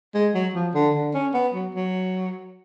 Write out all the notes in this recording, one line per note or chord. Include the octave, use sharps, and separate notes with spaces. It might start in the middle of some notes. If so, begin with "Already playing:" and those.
G#3
F#3
F3
D3
D3
C#4
B3
F#3
F#3